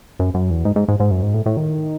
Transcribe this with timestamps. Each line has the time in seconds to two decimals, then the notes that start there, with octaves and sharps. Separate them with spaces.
0.19 F#2
0.34 F#2
0.50 E2
0.65 G#2
0.76 G#2
0.88 G#2
1.00 G#2
1.11 F#2
1.22 G#2
1.34 A2
1.46 A2
1.57 D#3